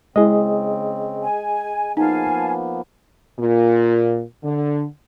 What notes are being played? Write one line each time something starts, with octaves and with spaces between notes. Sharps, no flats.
C#3 G#3 C4 E4 G#4 D#5
G#5
F3 A#3 B3 D#4 F5 G#5 A5
A#2
D3